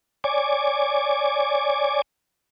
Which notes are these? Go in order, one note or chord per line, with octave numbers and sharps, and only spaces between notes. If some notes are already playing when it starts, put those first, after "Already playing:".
C#5 D5 G#5 D6